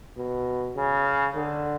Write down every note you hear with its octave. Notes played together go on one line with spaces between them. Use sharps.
B2
C#3
D3